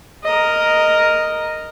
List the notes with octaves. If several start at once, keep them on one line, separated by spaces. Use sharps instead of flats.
A#4 D#5